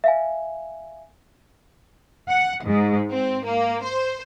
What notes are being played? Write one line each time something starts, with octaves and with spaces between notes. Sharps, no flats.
E5 F5 G#5
F#5
G#2
C4
A#3
C5